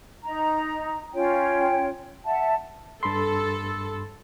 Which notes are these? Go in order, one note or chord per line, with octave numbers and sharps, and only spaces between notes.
D#4 A#5
C#4 F4 C#5 G5
E5 F#5 A5
G2 A4 B5 C6